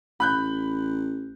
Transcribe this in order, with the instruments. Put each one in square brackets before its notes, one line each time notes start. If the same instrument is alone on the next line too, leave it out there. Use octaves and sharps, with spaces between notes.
[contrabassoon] A1 [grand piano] B5 F#6 G6